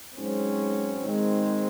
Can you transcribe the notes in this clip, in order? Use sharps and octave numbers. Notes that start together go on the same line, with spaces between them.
G#2 F#3 C4 C#4
G#2 D#3 G#3 C4